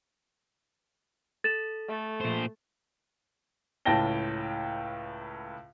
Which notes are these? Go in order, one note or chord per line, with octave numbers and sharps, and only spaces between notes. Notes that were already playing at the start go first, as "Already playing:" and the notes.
A4 A6 E7
A3
A#2 C5
C#2 A2 G5 A5 A#6 G7